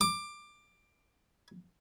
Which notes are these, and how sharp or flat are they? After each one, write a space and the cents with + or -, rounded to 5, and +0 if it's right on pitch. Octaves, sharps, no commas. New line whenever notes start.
D6 +15